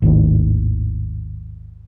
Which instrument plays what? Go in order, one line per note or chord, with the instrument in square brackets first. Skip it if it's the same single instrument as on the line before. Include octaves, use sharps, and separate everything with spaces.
[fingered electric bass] G#1 D#2 A2